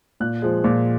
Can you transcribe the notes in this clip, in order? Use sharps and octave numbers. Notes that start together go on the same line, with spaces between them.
A#2 F#6
F3 G#3
A#2